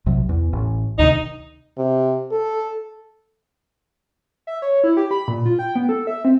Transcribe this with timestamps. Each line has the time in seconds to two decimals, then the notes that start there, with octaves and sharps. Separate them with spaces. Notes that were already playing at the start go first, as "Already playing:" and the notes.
0.06 B1 C3 F#3
0.29 E2
0.53 A1
0.99 D2 C3 D#3 D#4
1.77 C3
2.31 A4
4.47 E5
4.62 C#5
4.84 E4
4.97 G4
5.11 B5
5.28 A#2
5.46 F4
5.59 G5
5.76 B3
5.89 A4
6.07 E5
6.25 C4